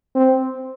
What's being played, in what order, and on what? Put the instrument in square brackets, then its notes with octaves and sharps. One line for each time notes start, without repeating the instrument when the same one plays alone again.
[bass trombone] C4